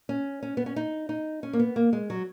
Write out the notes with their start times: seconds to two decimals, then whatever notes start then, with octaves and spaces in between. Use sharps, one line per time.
0.09 C#4
0.43 C#4
0.57 B3
0.66 C#4
0.76 D#4
1.09 D#4
1.43 C#4
1.53 A#3
1.59 B3
1.76 A#3
1.93 G#3
2.10 F#3